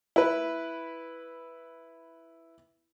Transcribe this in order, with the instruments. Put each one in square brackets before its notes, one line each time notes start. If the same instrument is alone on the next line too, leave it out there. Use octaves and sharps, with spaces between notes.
[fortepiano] E4 B4